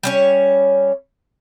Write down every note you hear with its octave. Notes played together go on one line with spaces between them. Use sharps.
G3 C#4 C#5